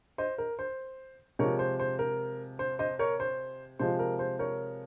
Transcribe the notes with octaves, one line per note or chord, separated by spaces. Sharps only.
C5 D#5
A#4
C5
C3 F3 G#3 A#4 C#5
C5
C5
A#4
C5
C5 D#5
A#4 C#5
C5
C3 F3 G#3 C5
A#4
C5
A#4 C#5